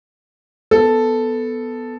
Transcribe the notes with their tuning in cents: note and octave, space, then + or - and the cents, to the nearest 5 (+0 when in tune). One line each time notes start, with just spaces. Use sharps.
B3 +5 A4 +0